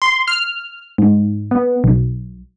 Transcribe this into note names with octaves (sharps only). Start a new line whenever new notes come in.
C6
F6
G#2
B3
B1